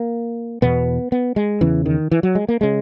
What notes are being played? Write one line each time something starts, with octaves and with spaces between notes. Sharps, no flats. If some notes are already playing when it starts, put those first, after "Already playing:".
Already playing: A#3
E2 B2 B3
B3
G#3
E2 C#3 E3
D#3
E3
F#3
G#3
A#3
C#3 G#3